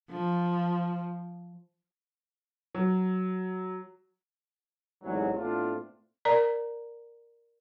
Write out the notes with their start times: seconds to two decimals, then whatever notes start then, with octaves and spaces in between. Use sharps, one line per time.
0.10 F3
2.75 F#3
5.03 A1 E2 G#2 C3 F#3
5.37 A2 A3 B3 C4 D4 F4
6.25 A#4 D5 A#5